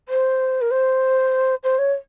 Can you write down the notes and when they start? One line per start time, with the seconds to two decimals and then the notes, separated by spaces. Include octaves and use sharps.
0.08 C5
0.61 A#4
0.71 C5
1.63 C5
1.78 C#5